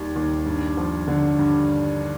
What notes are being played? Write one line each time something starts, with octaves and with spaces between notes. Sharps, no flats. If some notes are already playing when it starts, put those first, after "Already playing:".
Already playing: D#2 D#3 G3
D#2
G2
F3
D3
G2